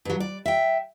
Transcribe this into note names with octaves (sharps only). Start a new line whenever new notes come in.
G2 F#3
D5
E5 G5